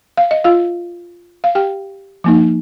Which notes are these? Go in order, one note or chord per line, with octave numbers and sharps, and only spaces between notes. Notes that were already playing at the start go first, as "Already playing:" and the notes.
F5
D#5
F4 F5
F5
G4 G5
F3 A#3 D#4